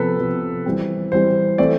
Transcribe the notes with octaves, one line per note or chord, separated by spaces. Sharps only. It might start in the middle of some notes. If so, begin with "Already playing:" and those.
Already playing: C3 F3 B3 A4 B4
C3 F3 B3
E3 G3 C4
E3 G3 C4 C5
E3 A3 C4 D5